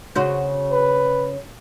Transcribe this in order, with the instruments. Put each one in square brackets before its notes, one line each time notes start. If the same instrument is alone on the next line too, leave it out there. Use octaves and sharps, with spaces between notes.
[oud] C#3 F#4 C5
[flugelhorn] B4